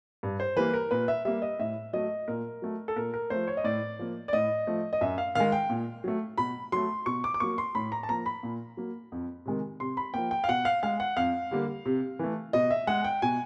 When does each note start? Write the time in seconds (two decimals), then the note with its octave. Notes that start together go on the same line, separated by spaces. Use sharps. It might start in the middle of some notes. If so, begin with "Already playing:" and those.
0.23 G2
0.40 C5
0.56 E3 G3 A#3 B4
0.74 A#4
0.91 A#2 B4
1.08 E5
1.25 G3 A#3 E5
1.42 D#5
1.60 A2 E5
1.93 F#3 A3 D#5
2.28 A#2 A#4
2.62 F#3 A3
2.88 A4
2.96 A#2 A#4
3.14 A#4
3.30 F3 A3 C5
3.47 C#5
3.57 D#5
3.64 A2 D5
3.99 F3 A#3
4.28 D5
4.33 A2 D#5
4.67 F3 A3
4.93 D#5
5.01 F#2 E5
5.18 F5
5.35 D#3 G#3 F5
5.52 G5
5.70 A#2
6.04 F#3 A3
6.38 B2 B5
6.72 F#3 A3 C6
7.06 B2 C#6
7.24 D6
7.34 D6
7.40 F#3 A#3 C#6
7.58 C6
7.75 A2 B5
7.92 A#5
8.03 A5
8.09 F3 A#3 A#5
8.26 B5
8.43 A#2
8.77 F#3 A#3
9.12 F2
9.45 C3 D#3 G#3
9.80 C3 C6
9.97 B5
10.14 F3 A#3 G5
10.31 G5
10.44 F5
10.48 B2 F#5
10.65 F5
10.83 G#3 F5
11.00 F#5
11.17 F2 F5
11.51 D3 G3 A#3
11.86 C3
12.19 E3 A3
12.53 B2 D#5
12.71 E5
12.87 G#3 F#5
13.04 G5
13.22 B2 G#5